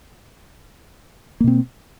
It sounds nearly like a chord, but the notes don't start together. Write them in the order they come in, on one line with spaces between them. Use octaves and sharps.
A#3 B2 C4